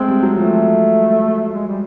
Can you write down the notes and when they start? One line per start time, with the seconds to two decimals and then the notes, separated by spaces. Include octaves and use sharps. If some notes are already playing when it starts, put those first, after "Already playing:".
Already playing: G#3 A3 C4
0.08 G3
0.23 F#3
0.37 F3 A3
1.53 G#3
1.68 G3